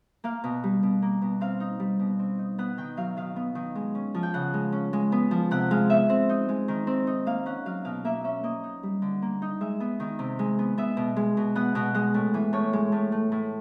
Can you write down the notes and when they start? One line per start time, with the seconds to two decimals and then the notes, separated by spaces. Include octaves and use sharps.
0.24 A#3 F5
0.44 B2
0.64 G3
0.83 B2
1.02 A#3
1.22 B2
1.41 C4 F5
1.60 D#4
1.80 G3
1.99 B2
2.19 C4
2.39 D#4
2.58 B3 F#5
2.78 D#3 G5
2.97 F#3 F5
3.17 D#3 F5
3.36 B3
3.55 D#3
3.75 G#3
3.95 C#4
4.15 F3
4.23 G5
4.34 C#3 F#5
4.54 G#3
4.72 C#4
4.93 G#3
5.12 B3
5.31 F3
5.51 C3 F#5
5.71 G#3 F5
5.89 B3 E5
6.10 C4
6.29 D#4
6.49 G#3
6.68 D#3
6.87 C4
7.07 D#4
7.26 A#3 F5
7.46 C#4 F#5
7.66 F#3 F5
7.85 B2 F5
8.05 A#3 E5
8.24 C#4 E5
8.43 A#3 D#5
8.64 D#4
8.83 G3
9.02 D3
9.22 A#3
9.42 D#4
9.61 G#3 E5
9.80 B3
10.00 D#3
10.19 C3
10.39 G#3
10.59 B3
10.78 B3 E5
10.97 B2
11.16 G#3
11.37 B2
11.55 B3 F#5
11.75 B2 F#5
11.94 G#3 F#5
12.14 A2
12.34 E3
12.53 A2 C#5
12.73 G#3
12.92 A2
13.12 A3
13.32 A2